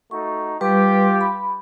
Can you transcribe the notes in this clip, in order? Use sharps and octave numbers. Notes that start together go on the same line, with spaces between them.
A3 D#4 F#4 C#6
G3 F4 G4 B4
B5